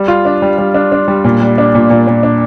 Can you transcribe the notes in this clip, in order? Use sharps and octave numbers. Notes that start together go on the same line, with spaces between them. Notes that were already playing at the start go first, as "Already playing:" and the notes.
Already playing: G3
F4
D4
G3
G3
D4
D4
G3
A#2
G3
D4
A#2
A#2
A#2
D4